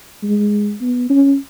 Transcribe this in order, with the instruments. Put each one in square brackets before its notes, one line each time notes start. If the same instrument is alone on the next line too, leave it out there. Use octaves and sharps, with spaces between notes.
[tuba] G#3
B3
C#4